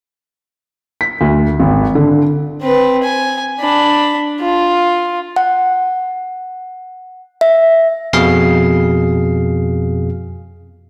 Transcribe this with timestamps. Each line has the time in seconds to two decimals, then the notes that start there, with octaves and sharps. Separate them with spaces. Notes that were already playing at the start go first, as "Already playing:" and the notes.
1.01 B6
1.21 D2
1.59 G#1
1.95 D3
2.62 C4 B4
3.03 G#5
3.60 D4 B5
4.41 F4
5.36 F#5
7.41 E5
8.13 F2 B2 G#4 F5 C7